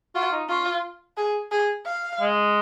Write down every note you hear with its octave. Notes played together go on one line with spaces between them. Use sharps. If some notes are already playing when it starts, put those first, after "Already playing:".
F4 F#4
D#4
C#4 F4
G#4
G#4
F5
G#3